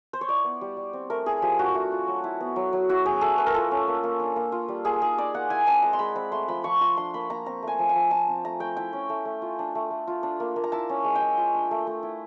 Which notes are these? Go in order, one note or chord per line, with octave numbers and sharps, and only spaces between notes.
C5
C#5
E4 D5
B3
G3
G3
C4
A3 A#4
E4 G#4
F3 G4
D4 F#4
A3
F4
F#3
E4
B3
F#3
F#3
E4 F#4
C#4 G#4
A3 A4
A3 B4
A#4
F4 A4
C#4
A#3
A#3
D4
A#3
F4
G3
A#3 G#4
D#4 G#4
D#4 D5
A#3 F#5
E4 G#5
C4 A5
G#3 A#5
C6
G#3 B5
C4 B5
A3 C6
F3 B5
F3 C#6
F4 C6
D4 C6
A#3 B5
A#3 A#5
C4 A#5
A3
G#5
F3
G#5
F3
F4 A5
C4
A3 A#5
A3 G5
E4 G5
C#4
A3
A3
F4
D4
A3
A3
F4
D4
A#3
A#3
A#5
E4 A5
C#4
G#3
G5
G#3
F4
D4
A3
A3
E4